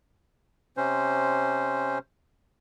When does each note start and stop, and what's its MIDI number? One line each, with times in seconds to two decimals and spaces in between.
0.77 1.98 48
0.77 1.98 61
0.77 1.98 72